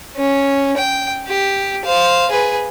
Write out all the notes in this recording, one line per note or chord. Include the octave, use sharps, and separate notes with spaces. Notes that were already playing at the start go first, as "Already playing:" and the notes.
C#4
G5
G4
C5 F5
G#4 B4